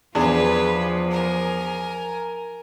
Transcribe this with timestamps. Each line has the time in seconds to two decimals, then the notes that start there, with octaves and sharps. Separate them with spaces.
0.15 E2 F3 D4 F4 G#4 B4
1.11 A#4 G#5